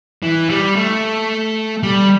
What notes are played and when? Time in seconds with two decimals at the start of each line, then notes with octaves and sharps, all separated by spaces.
0.22 E3
0.49 G3
0.76 A3
1.83 G3